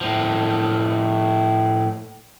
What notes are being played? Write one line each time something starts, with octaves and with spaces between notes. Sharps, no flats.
A2 F3